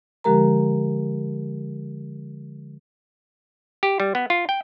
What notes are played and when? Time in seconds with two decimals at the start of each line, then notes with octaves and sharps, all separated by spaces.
0.24 D3 F3 G#3 G4 A#4 A#5
3.83 G4
4.00 G3
4.15 B3
4.30 F4
4.49 G5